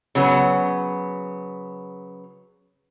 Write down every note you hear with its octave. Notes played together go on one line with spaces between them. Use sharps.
C#3 F#3 B3